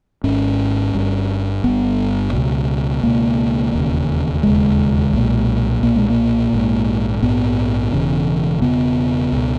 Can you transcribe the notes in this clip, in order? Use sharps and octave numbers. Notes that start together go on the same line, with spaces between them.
G#1 G#2 C#4
G1 G2
G1 G2 B3
C#2 B2
C#2 B2 A#3
E1 D#2 C#3
E1 D#2 C#3 G#3
B1 A#2
B1 A#2 A#3
G#3
A#3
A#1 G#2
A#1 G#2 B3
E1 E2 C#3
E1 E2 C#3 B3
C#2 B2